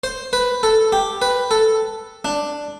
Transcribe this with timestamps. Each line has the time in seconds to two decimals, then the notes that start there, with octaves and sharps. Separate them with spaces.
0.04 C5
0.33 B4
0.63 A4
0.92 G4
1.22 B4
1.51 A4
2.25 D4